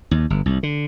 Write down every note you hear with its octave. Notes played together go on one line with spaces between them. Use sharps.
D#2
G1
C2
D3